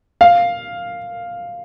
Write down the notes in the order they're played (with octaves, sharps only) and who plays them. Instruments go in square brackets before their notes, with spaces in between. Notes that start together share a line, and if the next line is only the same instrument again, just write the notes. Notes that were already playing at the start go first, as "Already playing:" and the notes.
[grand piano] F5